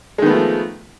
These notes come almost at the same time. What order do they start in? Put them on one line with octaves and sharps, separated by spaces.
G#3 D#3 B3 A3 F3